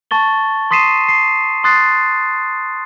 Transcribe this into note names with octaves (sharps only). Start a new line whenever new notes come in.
A5 C#6 A6 G7
C6 D#6 B6 C7 D#7 E7
C7
C6 D#6 F#6 A6 C7